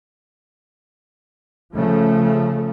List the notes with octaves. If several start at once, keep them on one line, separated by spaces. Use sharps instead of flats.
C#3 F3 A3